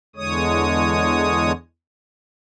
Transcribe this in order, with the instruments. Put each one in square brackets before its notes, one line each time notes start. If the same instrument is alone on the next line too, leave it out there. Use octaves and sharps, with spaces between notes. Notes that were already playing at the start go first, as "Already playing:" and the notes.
[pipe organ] E2 D3 G#3 C#5 D#6